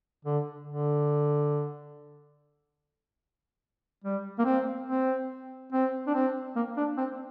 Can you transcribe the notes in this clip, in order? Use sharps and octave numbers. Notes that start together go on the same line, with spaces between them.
D3
D3
G3
A#3
C4
C4
C4
D4
C4
A#3
D4
C4